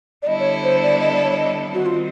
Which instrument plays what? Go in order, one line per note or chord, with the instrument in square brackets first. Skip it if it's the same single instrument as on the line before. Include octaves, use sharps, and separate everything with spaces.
[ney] D5
[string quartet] D3 G3 B3 E4 A4 [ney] D#5
[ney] C#5
C5
D5
D#5
D5
C#5
D#5
[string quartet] D#3 G3 C4 [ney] F#4
[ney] F4